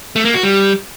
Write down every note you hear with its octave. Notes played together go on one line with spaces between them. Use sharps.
A3
A#3
F#4
G3